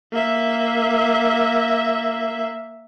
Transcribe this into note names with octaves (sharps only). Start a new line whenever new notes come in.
A#3 E5